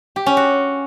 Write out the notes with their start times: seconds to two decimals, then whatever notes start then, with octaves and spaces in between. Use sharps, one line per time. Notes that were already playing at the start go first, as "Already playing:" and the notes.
0.16 G4
0.26 C#4
0.37 F#4